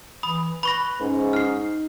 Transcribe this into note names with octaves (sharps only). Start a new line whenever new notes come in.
E3 B5 D#6
B4 B5 C#6 A#6
G#2 C#4
D#4 F6 C7